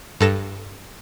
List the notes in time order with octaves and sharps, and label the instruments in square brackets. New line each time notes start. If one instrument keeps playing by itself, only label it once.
[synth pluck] G2 A4 A#6 E7